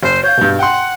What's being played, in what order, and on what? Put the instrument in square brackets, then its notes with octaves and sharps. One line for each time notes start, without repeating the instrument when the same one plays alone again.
[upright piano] F#1 [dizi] C5
[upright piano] C#5 F5 [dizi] G6
[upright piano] G2 B2
[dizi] F#5 [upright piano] G5 C6